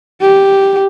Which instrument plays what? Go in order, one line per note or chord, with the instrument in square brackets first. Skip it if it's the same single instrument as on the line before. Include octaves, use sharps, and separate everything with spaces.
[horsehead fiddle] G4